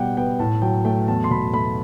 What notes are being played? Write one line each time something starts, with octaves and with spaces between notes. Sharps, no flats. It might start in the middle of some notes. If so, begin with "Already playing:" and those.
Already playing: B2 G3 F#5 G5
B3 G5
A2 A5
F#3 G5
A3 G5
E2 A5
C6
B2 B5
A3 B5